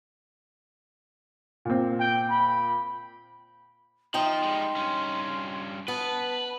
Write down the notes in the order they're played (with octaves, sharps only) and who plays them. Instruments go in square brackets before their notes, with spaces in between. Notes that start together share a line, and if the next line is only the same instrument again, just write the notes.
[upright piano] A#2 C4
[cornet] G5
B5
[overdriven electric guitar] F3 [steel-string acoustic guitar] D#4 D#5 G5 [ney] C6
[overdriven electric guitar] G3 G#3
G2 C#4
[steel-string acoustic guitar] B3 [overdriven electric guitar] B4 [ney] A5